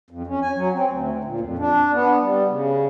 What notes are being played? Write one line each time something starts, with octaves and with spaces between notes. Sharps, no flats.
F2
C#4
G#5
F#3
C4
D2
A#2
F2
D4
B3
G3
C#3